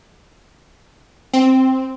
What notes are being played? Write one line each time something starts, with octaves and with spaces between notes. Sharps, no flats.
C4